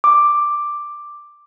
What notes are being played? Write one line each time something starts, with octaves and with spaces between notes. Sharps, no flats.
D6